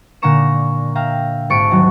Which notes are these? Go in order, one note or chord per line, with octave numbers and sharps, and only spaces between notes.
A#2 D3 F5 A#5 C#6 E7
E5 F5 G5 A#5
G#1 G#4 A4 C#6 C#7 D7
D#1 F#3